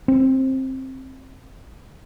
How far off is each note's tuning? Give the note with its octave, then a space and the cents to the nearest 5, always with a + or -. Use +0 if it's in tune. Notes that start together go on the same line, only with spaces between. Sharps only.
C4 +15